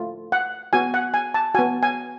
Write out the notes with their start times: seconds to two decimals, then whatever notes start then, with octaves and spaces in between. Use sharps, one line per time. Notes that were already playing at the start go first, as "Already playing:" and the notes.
Already playing: A3 F4
0.32 F#5
0.73 B3 F#4 G#5
0.94 F#5
1.14 G#5
1.34 A5
1.54 B3 F#4 G#5
1.83 G#5